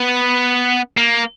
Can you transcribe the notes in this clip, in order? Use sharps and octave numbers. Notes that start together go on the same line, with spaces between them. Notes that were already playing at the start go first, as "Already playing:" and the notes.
Already playing: B3
A#3